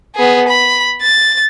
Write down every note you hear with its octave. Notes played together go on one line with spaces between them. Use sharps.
B3 G#4
B5
A6